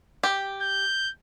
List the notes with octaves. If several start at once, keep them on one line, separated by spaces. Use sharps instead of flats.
G4
G6